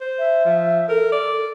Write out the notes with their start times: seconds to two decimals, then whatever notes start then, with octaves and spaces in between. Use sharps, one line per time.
0.01 C5
0.18 E5
0.45 F3
0.89 A4 A#4
1.12 D5